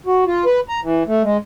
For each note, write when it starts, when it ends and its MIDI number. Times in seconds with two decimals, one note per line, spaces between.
0.06 0.24 66
0.26 0.45 65
0.46 0.60 71
0.69 0.80 82
0.83 1.03 52
1.07 1.22 57
1.23 1.37 56